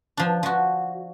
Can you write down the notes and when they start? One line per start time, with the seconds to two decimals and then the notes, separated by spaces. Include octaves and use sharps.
0.17 F3 D4
0.43 F3 F#4